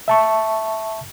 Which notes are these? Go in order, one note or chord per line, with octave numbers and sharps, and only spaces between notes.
E5 A5 C#6